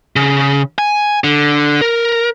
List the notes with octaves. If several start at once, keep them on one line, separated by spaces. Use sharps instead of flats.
C#3
G#5
D3
A#4